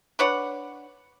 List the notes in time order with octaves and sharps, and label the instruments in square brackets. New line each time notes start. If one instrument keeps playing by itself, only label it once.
[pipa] D4 B4 C#5 F#5